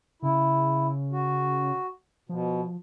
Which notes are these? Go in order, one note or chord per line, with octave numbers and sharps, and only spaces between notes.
C#3 E4
F#4
B2 F3